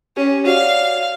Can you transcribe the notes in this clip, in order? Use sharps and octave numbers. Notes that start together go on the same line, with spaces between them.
C#4 G4
F#4 C#5 D5 F5